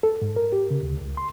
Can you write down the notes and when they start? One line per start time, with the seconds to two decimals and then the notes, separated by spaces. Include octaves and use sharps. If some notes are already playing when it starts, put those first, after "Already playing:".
0.03 A4
0.22 G#2
0.36 A#4
0.52 G4
0.71 C#3
0.83 D2
1.01 C#2
1.17 C6